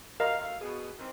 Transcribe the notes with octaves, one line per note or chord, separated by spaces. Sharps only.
F#4 G4 A#4 D#5 F5 A#5
F#2 A3 F5
B2 G#4
D#3 E3 C4